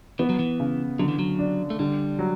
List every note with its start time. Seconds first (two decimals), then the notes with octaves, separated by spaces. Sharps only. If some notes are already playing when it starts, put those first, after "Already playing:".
0.19 E3 B3
0.29 F#3
0.39 E3
0.60 C#3
0.99 D3 F#3
1.08 E3
1.19 F#3
1.39 D4
1.70 A3
1.79 D3 G3
2.19 F#3